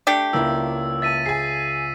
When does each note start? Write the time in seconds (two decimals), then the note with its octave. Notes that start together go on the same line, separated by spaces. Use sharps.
0.07 A3 D4 G4
0.33 C#2 A#3 E4 E6
1.02 E5 A5 A6 B6 D#7
1.26 G#4 G#5 C7